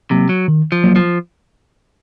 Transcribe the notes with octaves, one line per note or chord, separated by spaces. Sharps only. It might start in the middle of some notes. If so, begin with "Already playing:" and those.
C3 F#3 A#3
F#3
D#3
F3
F#3 A#3
F3